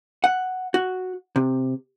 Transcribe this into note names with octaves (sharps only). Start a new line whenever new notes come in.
F#5
F#4
C3